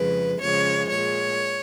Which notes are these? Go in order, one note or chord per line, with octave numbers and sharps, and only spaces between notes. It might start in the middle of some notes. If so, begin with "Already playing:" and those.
Already playing: F2 C#3 G#3 B4
F2 C#3 F3 G#3 C#5
A#2 G#3 C#5